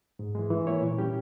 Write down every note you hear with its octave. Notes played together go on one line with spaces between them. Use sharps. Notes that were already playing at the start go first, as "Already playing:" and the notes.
G#2
E3 G#3
E3
A#3 E4 A#4 C#5
A#2
G3 C#4 G4